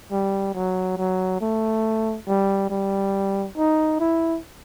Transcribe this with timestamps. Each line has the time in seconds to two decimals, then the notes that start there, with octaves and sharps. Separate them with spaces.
0.12 G3
0.55 F#3
0.97 F#3
1.41 A3
2.27 G3
2.70 G3
3.57 D#4
4.00 E4